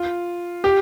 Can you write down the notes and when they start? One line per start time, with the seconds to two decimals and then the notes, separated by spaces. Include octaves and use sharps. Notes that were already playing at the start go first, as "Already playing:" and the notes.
Already playing: F4
0.64 G4